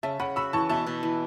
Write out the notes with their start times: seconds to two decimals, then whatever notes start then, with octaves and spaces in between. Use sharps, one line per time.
0.03 C#3 E5 A5
0.19 C#3 F#5 B5
0.36 F#4 B5 E6
0.53 E3 A5 C#6
0.69 B2 E5 A5
0.87 B2
1.03 E3